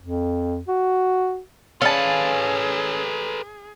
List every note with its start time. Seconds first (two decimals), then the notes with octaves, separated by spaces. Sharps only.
0.01 F2
0.68 F#4
1.82 C#4 G#4 A4 B4 F5 A5